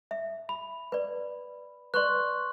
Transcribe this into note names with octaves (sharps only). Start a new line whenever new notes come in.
E5
B5
B4 D5
B4 D5 C6 C#6 F#6